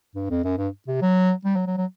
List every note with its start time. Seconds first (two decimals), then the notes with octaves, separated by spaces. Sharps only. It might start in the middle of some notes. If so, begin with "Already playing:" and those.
0.15 G2
0.30 F2
0.44 F#2
0.58 G2
0.88 C3
1.02 F#3
1.45 G3
1.56 F#3
1.67 F#3
1.77 F#3